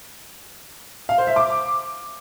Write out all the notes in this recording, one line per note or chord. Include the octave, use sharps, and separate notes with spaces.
F5
C5
E5
D6